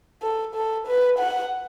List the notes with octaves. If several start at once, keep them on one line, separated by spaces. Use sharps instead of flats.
A4
A4
B4
F#5